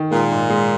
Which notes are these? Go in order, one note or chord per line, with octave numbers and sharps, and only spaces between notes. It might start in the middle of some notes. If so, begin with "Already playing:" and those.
Already playing: D#3
A#2 G#3
G#2
G#3